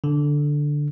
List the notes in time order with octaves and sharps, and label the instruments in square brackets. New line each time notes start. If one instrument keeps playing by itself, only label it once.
[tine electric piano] D3